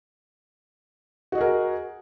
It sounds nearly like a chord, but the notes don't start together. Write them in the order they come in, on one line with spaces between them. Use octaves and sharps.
F#4 D#5 G#4 A#4